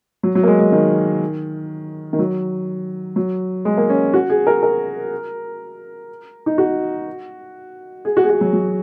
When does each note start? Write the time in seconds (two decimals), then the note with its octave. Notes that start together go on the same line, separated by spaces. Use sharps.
0.23 F#3
0.35 F#3
0.43 A#3
0.47 G#3
0.60 G#3
0.72 D#3
2.13 D#3
2.19 F#3
3.16 F#3
3.65 G#3
3.77 A#3
3.89 C#4
4.14 F#4
4.30 G#4
4.47 A#4
4.63 A#4
6.46 D#4
6.58 F#4
8.05 G#4
8.17 F#4
8.24 G#4
8.29 F#4
8.41 F#3
8.53 F#3